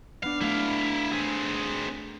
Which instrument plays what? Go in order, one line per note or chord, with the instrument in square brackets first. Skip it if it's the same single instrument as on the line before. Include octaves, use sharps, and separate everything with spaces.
[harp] B3 D4 [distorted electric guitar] F5
[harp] A3 [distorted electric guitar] E4 F5
[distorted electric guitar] C4 G#4